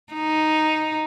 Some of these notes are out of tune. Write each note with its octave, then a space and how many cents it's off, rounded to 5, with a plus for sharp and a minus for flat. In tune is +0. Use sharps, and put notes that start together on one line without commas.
D#4 +0